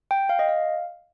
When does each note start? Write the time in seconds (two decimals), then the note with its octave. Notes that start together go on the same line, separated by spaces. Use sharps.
0.11 G5
0.29 F5
0.39 D#5
0.49 F5